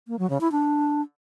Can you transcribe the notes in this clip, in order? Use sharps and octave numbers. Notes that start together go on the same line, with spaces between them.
A#3
F#3
C#3
E4
D4